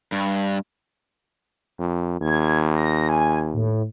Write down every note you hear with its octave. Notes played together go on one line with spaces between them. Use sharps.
G2
F2
D#2 G#6
A#6
G#5
A2